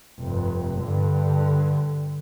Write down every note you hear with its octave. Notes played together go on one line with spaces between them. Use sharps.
F1 G2
G2 D3